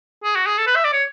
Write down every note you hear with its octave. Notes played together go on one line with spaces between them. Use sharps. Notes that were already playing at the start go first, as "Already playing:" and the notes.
G#4
F#4
G#4
A4
B4
E5
D5
C#5